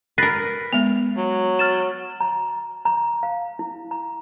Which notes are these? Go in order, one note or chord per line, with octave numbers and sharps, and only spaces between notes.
A#4 B4 A6 A#6 C7
G#3 B3 F7
F#3
F6 A6 E7
A#5
A#5
F5
E4
A#5